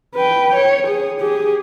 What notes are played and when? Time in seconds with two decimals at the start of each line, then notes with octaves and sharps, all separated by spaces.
0.15 B4 G5
0.55 C#5
0.87 G#4
1.21 G4 G#4